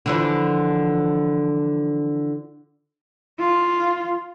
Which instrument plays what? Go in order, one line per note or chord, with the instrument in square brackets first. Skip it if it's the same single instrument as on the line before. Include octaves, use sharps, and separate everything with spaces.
[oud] D3 E3 F3
[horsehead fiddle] F4